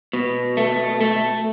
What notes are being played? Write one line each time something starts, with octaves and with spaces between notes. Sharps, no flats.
B2
A3
A3